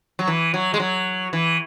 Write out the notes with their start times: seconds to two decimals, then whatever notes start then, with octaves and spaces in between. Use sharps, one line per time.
0.19 F#3
0.28 E3
0.54 F#3
0.74 G#3
0.80 F#3
1.33 E3